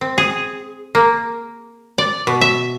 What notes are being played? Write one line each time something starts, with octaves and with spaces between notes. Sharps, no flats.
C4
G#4
A#3
D5
B2
E5